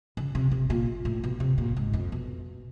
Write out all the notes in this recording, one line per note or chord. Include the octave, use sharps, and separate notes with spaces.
C#3
C3
C3
A#2
A2
B2
C3
A#2
G#2
F2
B2